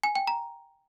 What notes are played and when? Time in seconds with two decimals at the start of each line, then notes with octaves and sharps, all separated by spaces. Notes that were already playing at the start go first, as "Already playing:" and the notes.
0.04 G#5
0.15 G5
0.27 A#5